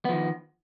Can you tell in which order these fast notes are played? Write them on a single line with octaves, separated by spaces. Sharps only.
B3 F3 D#3